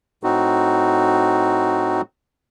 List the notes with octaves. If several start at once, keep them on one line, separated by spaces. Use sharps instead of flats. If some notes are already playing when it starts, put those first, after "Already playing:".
A2 C4 D#4 F#4